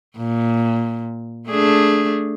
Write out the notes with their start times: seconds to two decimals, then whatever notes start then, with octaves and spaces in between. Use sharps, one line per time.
0.17 A#2
1.49 A3 D4 G#4